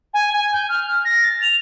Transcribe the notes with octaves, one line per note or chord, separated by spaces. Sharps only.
G#5
G#5
G6
F6
A#6
A6
F7